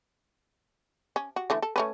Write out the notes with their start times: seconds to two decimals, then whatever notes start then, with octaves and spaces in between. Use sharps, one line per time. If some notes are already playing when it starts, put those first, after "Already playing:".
1.16 C#4
1.36 F#4
1.50 D3 E3 A3
1.62 A4
1.76 A3 C#4 B4